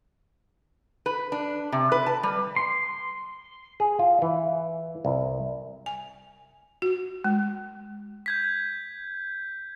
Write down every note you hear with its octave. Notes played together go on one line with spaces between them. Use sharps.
B4
D4
C3
B4
A5
G3
C6
G#4
F4
E3
C2
G#5
F#4
G#3
G6 G#6 B6